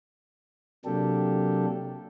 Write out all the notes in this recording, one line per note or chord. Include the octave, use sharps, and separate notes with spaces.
C3 F#3 A#3 D4 G4 A4